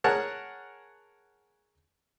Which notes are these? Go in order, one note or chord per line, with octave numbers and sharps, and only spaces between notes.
G#4 A#4 C#5 F#5 A5